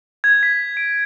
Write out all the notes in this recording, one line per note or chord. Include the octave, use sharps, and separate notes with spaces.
G#6
B6
D7